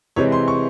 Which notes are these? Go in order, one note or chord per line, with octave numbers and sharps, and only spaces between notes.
C3 E3 G#3 C4 C#5
C6
C#6